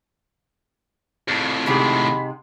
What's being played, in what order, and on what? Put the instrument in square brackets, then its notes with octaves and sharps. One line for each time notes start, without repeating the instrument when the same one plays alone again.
[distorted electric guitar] F2 A2
[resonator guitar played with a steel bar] G#2 C3 G#3 [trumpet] B5